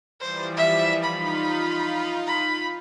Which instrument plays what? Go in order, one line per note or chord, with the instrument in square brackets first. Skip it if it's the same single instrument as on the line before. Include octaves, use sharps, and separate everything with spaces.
[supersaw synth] E3 F3 G3 [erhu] C5
[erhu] E5
[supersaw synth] D#4 F4 [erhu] B5
[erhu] B5